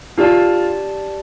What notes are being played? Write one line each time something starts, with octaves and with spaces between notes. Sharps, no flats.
D4 F4 G4 D5 A5